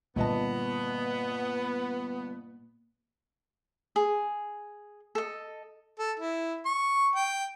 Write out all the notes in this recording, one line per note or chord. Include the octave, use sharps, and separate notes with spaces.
G1 A#2 A#3 B3 D#5 A5
G#4
A4 D#5
A4
E4
C#6
G5